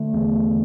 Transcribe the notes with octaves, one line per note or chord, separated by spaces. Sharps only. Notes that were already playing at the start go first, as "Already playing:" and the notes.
Already playing: D3 A3
E2